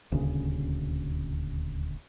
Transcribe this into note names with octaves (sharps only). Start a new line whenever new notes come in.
D#1 D2 C#3